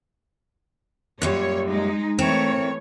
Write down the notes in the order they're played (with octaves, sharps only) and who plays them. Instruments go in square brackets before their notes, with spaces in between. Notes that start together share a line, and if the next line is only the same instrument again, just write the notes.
[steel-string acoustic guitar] F#2 A#2 G3 [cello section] C#5
[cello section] G#3 D#4
[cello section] E3 A3 C#5 [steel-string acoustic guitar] C4 A#4